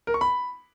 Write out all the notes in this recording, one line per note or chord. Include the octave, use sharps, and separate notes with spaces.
A#4
C#6
B5